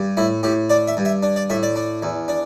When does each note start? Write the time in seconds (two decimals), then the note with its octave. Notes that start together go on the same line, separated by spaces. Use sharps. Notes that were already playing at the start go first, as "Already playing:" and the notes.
Already playing: G2
0.17 A2 E4
0.43 A2 G4
0.70 D4 D5
0.88 E5
0.97 G2
1.05 E5
1.23 D4
1.36 D5
1.50 A2 E5
1.63 D5
1.76 D4
2.03 E2
2.28 D4